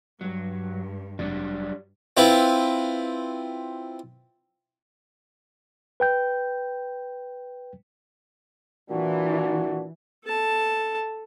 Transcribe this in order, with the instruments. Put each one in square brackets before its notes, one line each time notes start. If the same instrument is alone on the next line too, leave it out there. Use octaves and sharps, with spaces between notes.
[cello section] G2 [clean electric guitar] F#3
[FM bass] F1 [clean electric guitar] F#3 G3 D4
[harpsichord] C4 E4 F4 B4
[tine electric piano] B4 G5 G6
[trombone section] A#2 D4 F#4 [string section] E3
[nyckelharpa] A4 A5